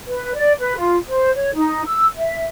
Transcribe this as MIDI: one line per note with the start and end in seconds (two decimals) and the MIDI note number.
0.07 0.34 71
0.35 0.53 74
0.59 0.75 71
0.76 0.96 65
1.08 1.34 72
1.35 1.53 73
1.54 1.81 63
1.86 2.04 88
2.16 2.46 76